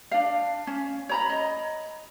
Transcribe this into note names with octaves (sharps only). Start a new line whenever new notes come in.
D4 F5
C#4
C#5 A#5 B5
D#5